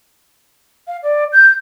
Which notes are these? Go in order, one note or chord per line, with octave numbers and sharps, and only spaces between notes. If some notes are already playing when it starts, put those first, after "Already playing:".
F5
D5
G6